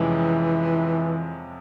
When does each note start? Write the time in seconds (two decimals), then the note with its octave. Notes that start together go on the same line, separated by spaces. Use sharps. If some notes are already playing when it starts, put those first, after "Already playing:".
Already playing: F2 C3 E3 F3 G#3 C#4